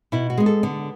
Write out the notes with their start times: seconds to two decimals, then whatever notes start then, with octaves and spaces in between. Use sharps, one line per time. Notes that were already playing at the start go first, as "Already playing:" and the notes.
0.12 B2 E4
0.30 F#4
0.38 G#3 B3
0.46 A4
0.63 D3 B3